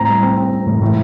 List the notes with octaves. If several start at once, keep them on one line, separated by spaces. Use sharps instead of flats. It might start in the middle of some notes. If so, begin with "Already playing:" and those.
Already playing: A2 C4 A#5
G3
C4
C4
C4
A2
A2